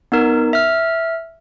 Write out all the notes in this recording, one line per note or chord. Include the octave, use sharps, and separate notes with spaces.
B3 D#4 A#4
E5 F6